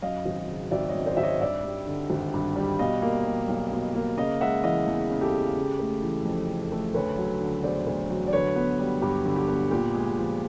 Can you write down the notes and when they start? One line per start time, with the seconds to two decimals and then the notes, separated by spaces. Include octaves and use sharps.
0.02 F#2 D#5 F5
0.26 G#1
0.48 C#3
0.71 G#1 D5 E5
0.89 C#5 D#5
0.94 F#2
1.06 C5 D5
1.17 G#1 E5
1.23 C#5 D#5
1.41 G2 D5 E5
1.64 G3
1.87 D3
2.10 G#1
2.34 G2
2.56 G3
2.79 B2 D#5 F5
3.02 A#3
3.25 G3
3.48 B1
3.72 B2
3.95 A#3
4.17 C#3 D#5 F5
4.41 G#3 E5 F#5
4.63 E3 D#5 F5
4.87 E2
5.10 C#3
5.21 G4 A4
5.33 G#3
5.57 C#3
5.79 A3
6.02 E3
6.25 F2
6.49 C#3
6.72 A3
6.94 D2 B4 C#5
7.17 F#3
7.41 D3
7.63 E1 C5 D5
7.87 D2
8.10 F#3
8.27 D5
8.33 D3 B4 C#5
8.56 B3
8.79 G3
9.02 G2 G4
9.25 D3
9.36 G4
9.48 B3
9.71 A#2 G4
9.95 G#3 G#4
10.18 F3